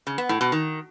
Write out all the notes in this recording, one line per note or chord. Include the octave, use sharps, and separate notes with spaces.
C#3
B3
A2
B2
D#3